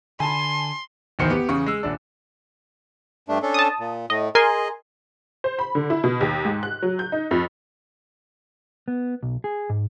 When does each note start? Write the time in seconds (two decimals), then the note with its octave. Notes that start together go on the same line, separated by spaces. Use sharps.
0.20 D3 G#5 A5 B5 C6
1.19 D1 E2 D#3 C5 C#7
1.30 B3 G4
1.49 E2 C#3 C#6
1.66 G#3 E6
1.83 D#1 D4
3.29 G2 A3 D4
3.42 C#4 D4 A4
3.54 A5 D#6
3.79 A#2
4.10 A2 D#5
4.35 G#4 A#4 D#5 G#5 C6
5.44 C5
5.59 B5
5.75 D3
5.90 E4
6.04 B2
6.21 D#2
6.45 G#2
6.63 F#6
6.82 F#3
6.99 G6
7.12 D#4
7.31 F2
8.88 B3
9.23 B1
9.44 G#4
9.69 G#2